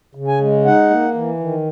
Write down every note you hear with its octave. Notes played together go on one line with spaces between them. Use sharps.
C#3
G#5
G#3
D#4 F#5
A#3
E3
D#3